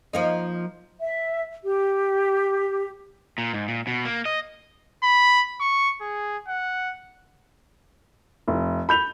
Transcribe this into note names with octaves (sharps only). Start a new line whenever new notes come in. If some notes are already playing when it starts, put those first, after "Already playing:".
F3 A#3 D#4
E5
G4
A#2
G#2
A#2
B2
A#3
D#5
B5
C#6
G#4
F#5
F1
B5 G6 F7